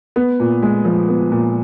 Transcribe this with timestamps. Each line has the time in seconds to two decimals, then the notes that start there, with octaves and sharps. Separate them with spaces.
0.16 B3
0.40 A#2
0.62 G#3
0.85 F3
1.09 B3
1.32 A#2